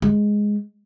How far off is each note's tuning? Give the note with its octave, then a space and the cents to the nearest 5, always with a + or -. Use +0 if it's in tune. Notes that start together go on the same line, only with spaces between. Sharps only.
G#3 +0